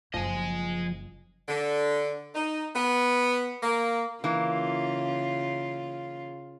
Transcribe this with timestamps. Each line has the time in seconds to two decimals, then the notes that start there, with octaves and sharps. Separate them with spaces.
0.14 F#1 F3 D#5 G#5
1.48 D3
2.34 D#4
2.75 B3
3.62 A#3
4.24 C#3 E3 A#3 F4